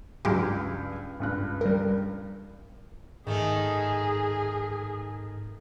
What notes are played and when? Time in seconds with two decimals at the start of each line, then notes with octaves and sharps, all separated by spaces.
0.25 C#2 G2 F#3 G#3 G4
1.20 C#2 G2 F#6
1.61 G3 A#4
3.27 G#2 D#3 A3 G#4